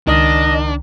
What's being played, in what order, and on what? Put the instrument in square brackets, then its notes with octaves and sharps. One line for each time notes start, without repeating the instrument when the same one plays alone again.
[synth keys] C#2 [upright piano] D#3 [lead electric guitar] D4 [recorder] D#5